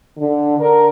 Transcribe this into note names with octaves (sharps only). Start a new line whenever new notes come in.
D3
D3 A#4